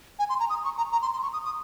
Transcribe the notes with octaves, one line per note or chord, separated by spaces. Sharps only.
G#5
C6
A#5
D#6
C#6
A#5
A#5
C6
C6
C#6
D#6
D#6